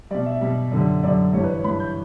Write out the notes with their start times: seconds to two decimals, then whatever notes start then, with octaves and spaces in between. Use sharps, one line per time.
0.11 B2 G3 D5
0.26 E5
0.41 B2 G3
0.71 F#2 D3 G3
1.03 F#2 D3 G3 D5
1.33 G2 E3 G3 C#5
1.44 B4
1.54 C#5
1.64 G2 E3 G3 B5
1.80 G6